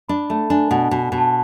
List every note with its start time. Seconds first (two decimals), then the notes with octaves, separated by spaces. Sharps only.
0.09 D4 B5
0.30 A3 A5
0.50 D4 G#5
0.71 B2 F#5
0.91 B2
1.12 B2
1.18 A5